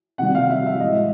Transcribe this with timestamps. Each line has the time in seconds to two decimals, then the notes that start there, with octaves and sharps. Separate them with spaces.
0.18 C3 D#3 G3 F#5
0.35 F5
0.50 E5
0.66 E5
0.80 A2 E3 G#3 D#5